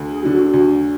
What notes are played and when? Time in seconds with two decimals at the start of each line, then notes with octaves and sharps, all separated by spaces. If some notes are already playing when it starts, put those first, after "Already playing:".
Already playing: D2
0.12 G#4
0.23 D3 F#3
0.33 F#4
0.53 D2 F#4